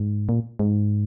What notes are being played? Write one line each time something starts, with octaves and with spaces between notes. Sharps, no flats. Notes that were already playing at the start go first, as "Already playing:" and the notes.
Already playing: G#2
A#2
G#2